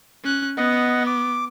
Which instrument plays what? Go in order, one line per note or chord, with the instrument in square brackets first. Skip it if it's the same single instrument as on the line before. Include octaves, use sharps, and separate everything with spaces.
[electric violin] C#4 F#6
[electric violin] B3 [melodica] D#5 F#5
[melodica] D6